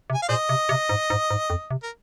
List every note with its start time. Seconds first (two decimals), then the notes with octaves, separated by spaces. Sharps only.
0.10 C3
0.14 G#5
0.22 F5
0.29 A#2 G#4 C5 D#5
0.49 C3
0.69 C3
0.89 G#2
1.10 G#2
1.30 G#2
1.50 F2
1.71 C3
1.83 A#4